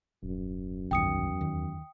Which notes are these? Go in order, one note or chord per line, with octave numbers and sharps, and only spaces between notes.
D#1 F#2
A#1 E2 G2 D#3 G5 D#6 C#7
D#2 D#3